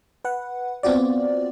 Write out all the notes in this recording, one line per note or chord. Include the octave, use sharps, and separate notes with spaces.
B4 F#5
B3 C4 F4 F#4 D5